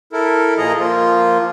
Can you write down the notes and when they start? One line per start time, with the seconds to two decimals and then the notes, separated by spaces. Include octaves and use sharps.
0.13 E4 A4 A#4
0.58 A#2 F3 G#4 D#5 A#5
0.79 F3 A#3 F4